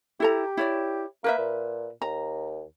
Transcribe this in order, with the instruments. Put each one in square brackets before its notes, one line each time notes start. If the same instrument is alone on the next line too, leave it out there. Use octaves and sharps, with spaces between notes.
[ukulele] E4 A4 A#5 [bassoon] G4
[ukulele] E4 C#5 D5
[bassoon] A#3 [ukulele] A#4 B4 E5
[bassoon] A#2
[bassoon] D#2 [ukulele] A#5